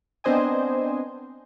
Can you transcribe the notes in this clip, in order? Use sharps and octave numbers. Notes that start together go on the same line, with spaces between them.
B3 C4 D4 C5 D#5 G#5